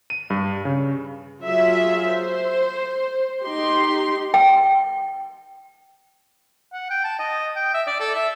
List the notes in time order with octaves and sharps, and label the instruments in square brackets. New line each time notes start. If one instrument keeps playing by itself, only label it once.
[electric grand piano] D#7
G2
C#3
[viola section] F#3 F4 G#4 E5
C5
D#4 G4 C6
[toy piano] G5
[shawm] F#5
G5
A5
D#5
G5
E5
D5
A4
E5